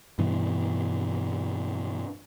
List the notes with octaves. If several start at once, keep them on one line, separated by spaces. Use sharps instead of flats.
G2 B2 E3